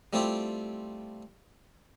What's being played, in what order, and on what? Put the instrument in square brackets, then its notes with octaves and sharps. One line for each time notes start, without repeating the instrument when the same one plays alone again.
[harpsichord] G3 A3 C4 E4 F4 G4